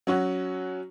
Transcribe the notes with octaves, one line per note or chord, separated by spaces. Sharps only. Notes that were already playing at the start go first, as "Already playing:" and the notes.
F#3 C#4 F#4